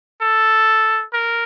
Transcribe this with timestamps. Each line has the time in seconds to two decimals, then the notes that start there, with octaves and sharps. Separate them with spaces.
0.21 A4
1.13 A#4